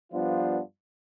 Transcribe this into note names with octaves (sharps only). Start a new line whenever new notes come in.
G2 F3 B3 D4 F4